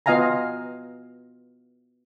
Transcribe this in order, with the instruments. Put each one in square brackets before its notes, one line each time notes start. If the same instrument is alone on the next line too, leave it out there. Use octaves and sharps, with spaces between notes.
[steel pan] B3 F4 D#5 F5 G#5 A#5